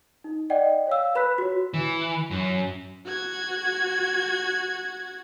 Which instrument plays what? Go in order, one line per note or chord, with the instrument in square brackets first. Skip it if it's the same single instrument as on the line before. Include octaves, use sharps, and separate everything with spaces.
[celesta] D#4
D5 D#5 F#5 G5
C#5 F5 E6
B4 B5 F#6 B6
F#4 C#5
[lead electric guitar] E3
F#2
[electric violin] F#4 G#6